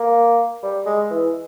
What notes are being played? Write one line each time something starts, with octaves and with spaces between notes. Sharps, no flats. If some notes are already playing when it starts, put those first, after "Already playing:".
Already playing: A#3
G3
G#3
E3